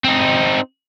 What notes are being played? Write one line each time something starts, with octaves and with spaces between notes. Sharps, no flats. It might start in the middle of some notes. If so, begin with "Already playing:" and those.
C4 D#4